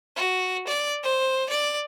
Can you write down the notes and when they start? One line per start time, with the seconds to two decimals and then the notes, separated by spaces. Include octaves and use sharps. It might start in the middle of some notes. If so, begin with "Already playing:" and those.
0.16 F#4
0.67 D5
1.03 C5
1.50 D5